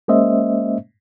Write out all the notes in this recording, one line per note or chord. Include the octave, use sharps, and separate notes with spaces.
G#3 A#3 C#4 C5 D#5 E5